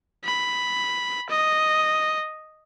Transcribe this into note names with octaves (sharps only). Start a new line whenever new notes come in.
B5
D#5